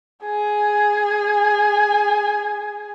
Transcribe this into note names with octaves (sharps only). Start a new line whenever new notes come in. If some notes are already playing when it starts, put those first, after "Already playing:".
G#4 G#5